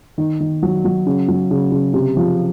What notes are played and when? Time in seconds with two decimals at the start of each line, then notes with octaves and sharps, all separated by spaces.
0.18 D#3
0.40 D#3
0.62 F#3
0.85 F#3
1.06 C#3
1.28 F#3
1.51 C#3
1.72 C#3
1.94 C3
2.17 F3